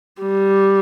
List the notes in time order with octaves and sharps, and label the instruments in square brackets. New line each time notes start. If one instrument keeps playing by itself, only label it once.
[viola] G3